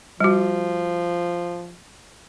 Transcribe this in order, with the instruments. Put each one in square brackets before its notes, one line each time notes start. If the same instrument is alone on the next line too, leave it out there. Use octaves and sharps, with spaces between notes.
[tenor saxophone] F3 [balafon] G3 F#4